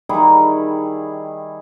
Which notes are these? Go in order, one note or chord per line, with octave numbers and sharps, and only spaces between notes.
D#3 G3 E4 G#4